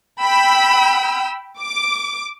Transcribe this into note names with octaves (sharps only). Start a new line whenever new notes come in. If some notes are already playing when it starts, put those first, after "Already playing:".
G5 B5 E6
D6